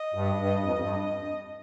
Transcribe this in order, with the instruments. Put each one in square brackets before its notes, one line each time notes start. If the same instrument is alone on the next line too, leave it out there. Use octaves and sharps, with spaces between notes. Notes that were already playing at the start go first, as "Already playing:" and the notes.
Already playing: [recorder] D#5
[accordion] G2
G2
F2
F2
G2